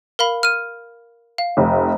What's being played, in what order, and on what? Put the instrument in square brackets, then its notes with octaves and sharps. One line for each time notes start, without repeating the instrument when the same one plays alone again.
[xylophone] A#4 F5 B5
F6 D#7
F5
[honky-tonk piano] F1